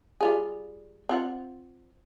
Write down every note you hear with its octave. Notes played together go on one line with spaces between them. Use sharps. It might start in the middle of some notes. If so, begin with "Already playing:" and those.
G3 F4 G#4
C4 F4 F#5